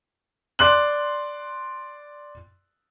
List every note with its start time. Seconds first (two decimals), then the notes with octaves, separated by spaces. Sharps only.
0.59 D5 C6 F#6 F#7